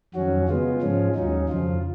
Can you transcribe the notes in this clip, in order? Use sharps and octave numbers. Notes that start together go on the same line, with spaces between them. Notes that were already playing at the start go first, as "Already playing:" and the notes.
F2 D#3 F#3 C#4 F#4
C#3 G#3 B3 F4
G#2 F3 G#3 C#4
D#2 D#3 F#3 C#4 D#4
F2 C#3 F3 F4